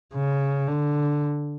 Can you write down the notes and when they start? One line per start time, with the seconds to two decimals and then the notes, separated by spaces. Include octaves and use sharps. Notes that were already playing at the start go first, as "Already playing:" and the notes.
0.14 C#3
0.68 D3